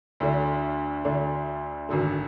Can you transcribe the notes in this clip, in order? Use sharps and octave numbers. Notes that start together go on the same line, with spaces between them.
D2 D3 A3 D4
D2 D3 A3 D4
G#1 F#2 D3 A3